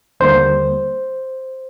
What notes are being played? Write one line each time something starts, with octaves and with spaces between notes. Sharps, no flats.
D#2 D3 G3 A#3 C5